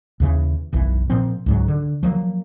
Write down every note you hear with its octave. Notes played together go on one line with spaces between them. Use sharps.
D#2 C#3 E3
F#1 B1 E3
A#2 F3 C4
C#2 G#2 F#3
D3
F3 F#3 A#3